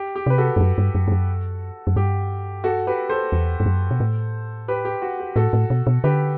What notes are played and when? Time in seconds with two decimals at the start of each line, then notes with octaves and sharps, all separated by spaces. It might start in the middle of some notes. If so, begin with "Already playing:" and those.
Already playing: G4
0.15 G4
0.26 C3 B4
0.38 F#4 A4
0.56 G2
0.61 F#2
0.78 G2
0.95 F#2
1.08 G2
1.12 F#2
1.87 F#2
1.96 G2 G4
2.64 F#4 A4
2.87 G4 B4
3.09 A4 C5
3.32 E2
3.60 G2
3.66 F#2
3.91 B2
4.00 A2
4.68 G4 B4
4.85 G4
5.02 F#4
5.20 G4
5.36 A2 F#4 A4
5.53 A2
5.70 B2
5.87 B2
6.04 D3 G4 B4